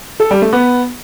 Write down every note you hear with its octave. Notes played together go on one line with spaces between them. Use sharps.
A4
G3
A3
B3